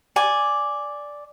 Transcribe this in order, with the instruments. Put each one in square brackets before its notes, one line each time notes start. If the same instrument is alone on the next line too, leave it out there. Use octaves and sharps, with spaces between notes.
[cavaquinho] D5 G#5